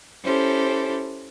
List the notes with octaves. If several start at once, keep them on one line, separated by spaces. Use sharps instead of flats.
C#4 E4 G4 A4 C5